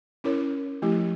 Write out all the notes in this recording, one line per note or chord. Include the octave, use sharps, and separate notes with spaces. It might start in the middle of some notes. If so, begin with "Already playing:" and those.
C#4 E4 A#4 C#5
F3 A3 E4 G4